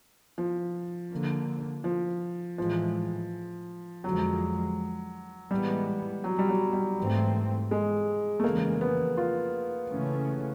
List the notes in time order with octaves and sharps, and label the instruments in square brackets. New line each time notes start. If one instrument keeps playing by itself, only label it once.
[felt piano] F3
[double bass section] D3 F3 A#3
[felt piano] F3
[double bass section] A2 E3 G#3 [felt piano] F3
[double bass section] F2 D3 F3 G#3 [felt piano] F#3
[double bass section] A2 E3 G#3 B3 [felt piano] G3
[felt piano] F#3
G3
F#3
G3
[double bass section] G#2 E3 A3 C4
[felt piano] G#3
A3
[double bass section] F2 C#3 E3 G#3 [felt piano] A#3
[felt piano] B3
F4
[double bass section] C#3 E3 A3 C#4